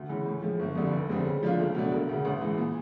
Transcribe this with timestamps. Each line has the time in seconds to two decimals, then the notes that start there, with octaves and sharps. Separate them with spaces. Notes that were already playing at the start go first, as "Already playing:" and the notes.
Already playing: D2
0.09 C#3 E3
0.26 A2
0.42 F3 G#3
0.59 G1
0.75 F2 D3 G3
0.93 F1
1.09 F2 D3 G3 C4
1.26 C#3
1.43 F3 A3 D4 F4
1.59 C#2
1.75 B2 F#3 A3 D4
1.91 E1
2.09 D2 C#3
2.25 A1
2.41 G#2 E3
2.58 A#2